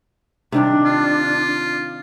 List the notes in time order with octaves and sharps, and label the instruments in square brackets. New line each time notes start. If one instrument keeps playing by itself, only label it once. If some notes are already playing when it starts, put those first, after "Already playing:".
[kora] C3 D#3 G3 [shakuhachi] D4
[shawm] F4